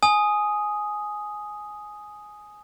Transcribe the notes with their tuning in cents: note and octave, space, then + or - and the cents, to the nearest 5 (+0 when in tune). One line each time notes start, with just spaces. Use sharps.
G#5 +10 D#6 +0